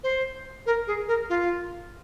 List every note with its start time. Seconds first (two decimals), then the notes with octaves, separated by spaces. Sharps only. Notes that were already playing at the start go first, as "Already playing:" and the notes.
0.03 C5
0.66 A#4
0.87 G#4
1.08 A#4
1.29 F4